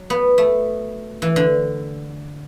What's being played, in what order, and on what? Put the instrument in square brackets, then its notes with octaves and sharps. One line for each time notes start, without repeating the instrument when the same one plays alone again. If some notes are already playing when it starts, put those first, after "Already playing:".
Already playing: [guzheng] F#3
B3
A3
E3
D3